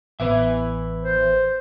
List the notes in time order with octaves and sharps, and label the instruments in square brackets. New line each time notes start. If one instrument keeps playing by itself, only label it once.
[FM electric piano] A1 B3 B4 [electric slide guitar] E3 E5
[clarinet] C5